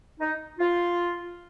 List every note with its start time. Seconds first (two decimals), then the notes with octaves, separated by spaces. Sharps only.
0.21 D#4
0.59 F4